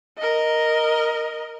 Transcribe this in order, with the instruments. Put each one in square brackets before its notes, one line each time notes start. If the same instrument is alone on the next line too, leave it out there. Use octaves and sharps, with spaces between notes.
[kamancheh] A#4 D#5